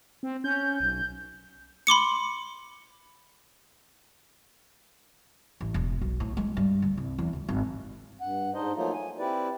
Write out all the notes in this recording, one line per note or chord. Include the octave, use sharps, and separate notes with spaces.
C4
C#4 G6
B1
B5 C6 D6 C#7
A1
E1
B1
A2
G#3
G2
D2
C2
E2
D2
G#1
G2 F#5
G#2 D4 D#4 C5 D#5
F3 F#3 A3 A#3 D#4 F4
G#5
C4 E4 G4 B4 D5